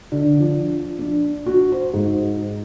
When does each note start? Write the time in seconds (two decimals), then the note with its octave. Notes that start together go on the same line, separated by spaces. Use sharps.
0.12 D3
0.40 F3
0.99 D4
1.46 F#4
1.72 C5
1.93 G#2